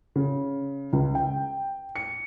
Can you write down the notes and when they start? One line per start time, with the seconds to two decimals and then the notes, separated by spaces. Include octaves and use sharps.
0.16 C#3
0.93 C#2
1.15 G5
1.96 C#7